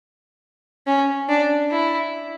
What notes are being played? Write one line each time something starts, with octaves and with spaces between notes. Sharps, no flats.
C#4
D4
E4